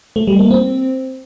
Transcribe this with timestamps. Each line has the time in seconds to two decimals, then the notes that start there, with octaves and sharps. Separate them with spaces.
0.16 A3
0.27 G3
0.39 A#3
0.51 C4